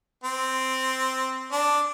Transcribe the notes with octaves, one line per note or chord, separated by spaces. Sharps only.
C4
D4